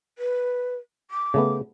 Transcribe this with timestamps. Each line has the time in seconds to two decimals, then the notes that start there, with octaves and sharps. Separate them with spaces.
0.18 B4
1.11 D6
1.34 C#3 A3 B3